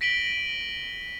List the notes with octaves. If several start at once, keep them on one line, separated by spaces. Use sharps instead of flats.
A#6 B6 D7 D#7 F#7 G7